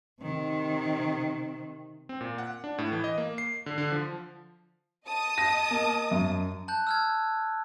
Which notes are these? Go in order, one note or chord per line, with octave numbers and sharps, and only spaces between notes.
C3 D#3
C4
A#2
F#5
D4
A2
E3
D#5
A#3
C7
D3
D3
F3
D#5 A5 D#6
A#6
A#3
F#2
A5 F#6 G6
E6 F6 G#6